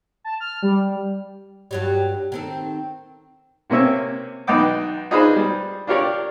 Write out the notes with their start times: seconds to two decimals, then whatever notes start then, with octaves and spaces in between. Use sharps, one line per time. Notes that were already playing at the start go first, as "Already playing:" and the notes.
0.24 A5
0.40 F6
0.62 G3
1.71 G2 F#3 G3
2.32 D#3 C4 A4
3.70 C3 A#3 C4 C#4 E5
4.47 B1 D#4 B4 G5 D6
5.10 D4 D#4 F4 G#4 B4 C5
5.35 G3
5.87 D4 F4 G4 A#4 C#5 D5